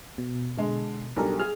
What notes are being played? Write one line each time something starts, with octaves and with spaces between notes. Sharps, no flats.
B2
D3 G#3
B1 G3 D4 A4 A#4
G#4 F6